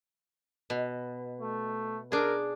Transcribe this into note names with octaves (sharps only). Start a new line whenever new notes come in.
B2
A3
D4 G#4 A#4